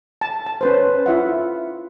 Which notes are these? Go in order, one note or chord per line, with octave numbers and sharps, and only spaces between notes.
A5
A5
C#4 B4 C5
E4 F4 E5 F#5